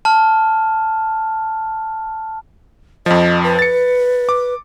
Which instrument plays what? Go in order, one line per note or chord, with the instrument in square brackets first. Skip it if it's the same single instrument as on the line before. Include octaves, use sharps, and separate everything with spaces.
[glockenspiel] A5 F6
[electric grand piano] F2 F3 [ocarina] D#5
[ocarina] B4
[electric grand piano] A6 C#7
D6